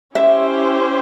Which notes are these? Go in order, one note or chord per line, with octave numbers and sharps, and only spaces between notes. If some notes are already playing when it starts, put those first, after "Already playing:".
C#4 E4 G4 C5 E5